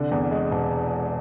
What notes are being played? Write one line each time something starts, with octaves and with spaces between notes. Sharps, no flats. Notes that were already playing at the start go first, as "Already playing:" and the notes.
Already playing: C2 D3
E2
G#3
E1